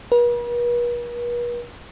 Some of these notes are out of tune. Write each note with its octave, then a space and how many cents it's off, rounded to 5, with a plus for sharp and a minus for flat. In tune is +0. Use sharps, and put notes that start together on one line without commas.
B4 -45